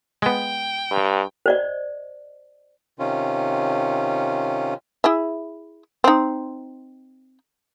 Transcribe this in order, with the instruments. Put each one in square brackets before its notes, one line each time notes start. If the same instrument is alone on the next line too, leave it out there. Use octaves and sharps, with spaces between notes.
[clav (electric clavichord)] G#3 B3 [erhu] G5
[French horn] G2
[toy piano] C5 D5 D#5
[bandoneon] C3 D#3 C#4 F4
[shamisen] E4 G#4 E5
C4 D#4